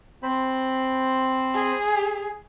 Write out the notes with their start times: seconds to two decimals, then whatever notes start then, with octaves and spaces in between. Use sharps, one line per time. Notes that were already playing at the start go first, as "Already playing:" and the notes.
0.23 C4 C5 B5
1.54 G#4